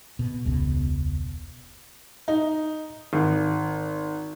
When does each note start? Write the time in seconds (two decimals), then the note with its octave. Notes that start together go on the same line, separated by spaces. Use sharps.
0.19 B2
0.45 E1 C#2 B2
2.28 D#4
3.13 G#1